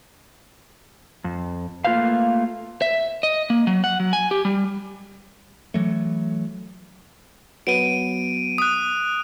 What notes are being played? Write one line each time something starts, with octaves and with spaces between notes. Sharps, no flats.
F2
A3 A#3 F4 B4 C5 F5
E5
D#5
A#3
F#3
F#5
F#3
G#5
G4
G3
E3 F#3 A3
F#3 B3 D7 D#7
D#6 F#6